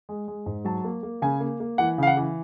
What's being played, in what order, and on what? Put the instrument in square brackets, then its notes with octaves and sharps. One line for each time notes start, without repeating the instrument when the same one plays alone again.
[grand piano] G#3
G#3
G#2
F#3 A5
A#3
A#3
C#3 G#5
A#3
A#3
E3 F#5
C#3 F5
F#5
E3